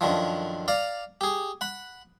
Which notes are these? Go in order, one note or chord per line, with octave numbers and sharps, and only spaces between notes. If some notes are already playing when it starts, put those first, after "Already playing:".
F#2 D3 D#3 F3
D5 F5 A#5
G4 G#4
F#5 B5